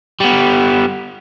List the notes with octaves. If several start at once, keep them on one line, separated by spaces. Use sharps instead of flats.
G3 B3